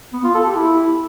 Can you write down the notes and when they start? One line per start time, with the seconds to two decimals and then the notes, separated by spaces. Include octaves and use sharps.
0.13 B3
0.24 F4
0.34 A4
0.45 G4
0.56 E4